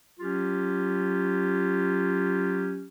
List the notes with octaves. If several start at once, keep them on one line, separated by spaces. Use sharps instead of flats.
F#3 C#4 F4 G4